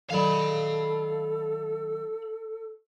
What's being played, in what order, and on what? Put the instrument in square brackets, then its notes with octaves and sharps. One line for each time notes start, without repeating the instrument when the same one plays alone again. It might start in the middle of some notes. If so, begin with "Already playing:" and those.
[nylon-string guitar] D#3 F#3 D5 [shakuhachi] A4 [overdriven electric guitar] F5 B5